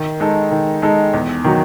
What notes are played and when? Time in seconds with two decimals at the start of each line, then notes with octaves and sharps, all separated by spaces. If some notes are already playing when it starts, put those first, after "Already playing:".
Already playing: D#3
0.20 G#3 D#4 A4
0.51 D#3
0.82 G#3 D#4 A4
1.13 E2
1.44 D#3 F#3